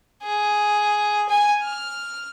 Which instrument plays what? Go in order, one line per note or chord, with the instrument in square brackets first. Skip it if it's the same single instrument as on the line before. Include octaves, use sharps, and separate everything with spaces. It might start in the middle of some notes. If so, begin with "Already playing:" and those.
[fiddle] G#4
G#5
F6